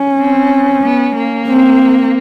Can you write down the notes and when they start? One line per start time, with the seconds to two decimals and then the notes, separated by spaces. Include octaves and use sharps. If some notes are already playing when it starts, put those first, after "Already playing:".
Already playing: C#4
0.18 C4
0.82 B3
1.15 A#3
1.48 C4